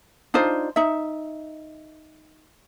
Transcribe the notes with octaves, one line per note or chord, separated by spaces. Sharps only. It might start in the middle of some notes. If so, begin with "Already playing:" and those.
D4 D#4 F4 C5
D#4 E5